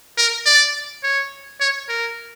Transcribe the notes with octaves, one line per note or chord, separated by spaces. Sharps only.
A#4
D5
C#5
C#5
A#4